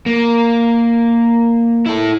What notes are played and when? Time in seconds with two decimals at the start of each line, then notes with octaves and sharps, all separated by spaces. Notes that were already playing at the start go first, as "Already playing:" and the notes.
0.06 A#3
1.86 E4 A4